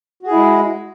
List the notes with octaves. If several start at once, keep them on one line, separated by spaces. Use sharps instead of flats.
G#3 E4 F#4 G#4